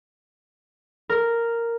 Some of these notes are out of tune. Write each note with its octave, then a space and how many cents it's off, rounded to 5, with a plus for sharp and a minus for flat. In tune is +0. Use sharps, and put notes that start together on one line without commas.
A#4 -5